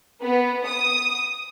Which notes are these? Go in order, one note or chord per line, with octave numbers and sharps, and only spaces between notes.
B3
D#6